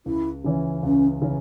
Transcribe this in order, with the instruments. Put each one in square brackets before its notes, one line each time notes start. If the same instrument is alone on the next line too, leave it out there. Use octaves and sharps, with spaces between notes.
[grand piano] C#2 [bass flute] E4
[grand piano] C#3 E3 C#4
[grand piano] C#2 [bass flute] C#4
[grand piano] C#3 E3 C#4